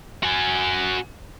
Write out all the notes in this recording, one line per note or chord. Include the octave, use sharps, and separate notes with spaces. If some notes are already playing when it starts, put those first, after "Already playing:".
F#4 G#5